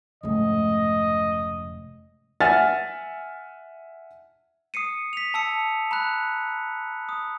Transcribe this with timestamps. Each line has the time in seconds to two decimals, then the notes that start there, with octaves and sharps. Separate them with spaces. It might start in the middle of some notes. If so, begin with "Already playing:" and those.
0.23 F1 G#2 C#3 A3 D#5
2.40 E5 F#5 G#5 F6 A6
4.74 D#6 C7 C#7 D#7
5.13 B6 F7
5.34 A5 E6 C#7
5.91 A#5 B5 F#6
7.09 D#6